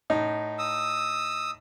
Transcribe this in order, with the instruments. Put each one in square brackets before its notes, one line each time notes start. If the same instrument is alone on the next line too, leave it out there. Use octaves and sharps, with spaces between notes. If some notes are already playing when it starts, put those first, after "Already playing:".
[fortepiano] A2 D#4
[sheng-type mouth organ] D#6 E6